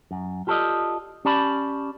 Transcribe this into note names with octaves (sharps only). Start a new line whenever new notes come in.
F#2
F4 G4 A4 C5 D5 D#5
C#4 G4 D5 A5 B5